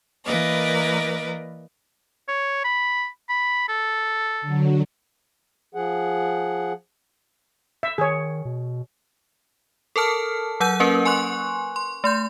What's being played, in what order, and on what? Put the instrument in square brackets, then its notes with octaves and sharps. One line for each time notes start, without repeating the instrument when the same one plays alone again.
[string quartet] E3 A#3 A#4 B4 D5 D#5
[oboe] C#5
B5
B5
A4
[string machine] D3 F#3
[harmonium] F3 G#4 F#5
[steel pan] E5
[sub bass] D#3 [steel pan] G#4 C#5
[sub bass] B2
[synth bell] A4 A#4 A5 F6
F#3 F#5 E6 G6 D#7
A#3 C#4 A#4 B4
G#5 C6 C#6 F#6
C6
A3 C6 G6